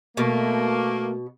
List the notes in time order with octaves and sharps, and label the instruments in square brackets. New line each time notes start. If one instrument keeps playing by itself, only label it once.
[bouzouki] B2 [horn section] A3 A#3